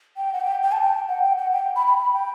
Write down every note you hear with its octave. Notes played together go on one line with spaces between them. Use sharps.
G5
F#5
G5
G5
A5
G5
F#5
G5
F#5
G5
B5
B5
B5
G5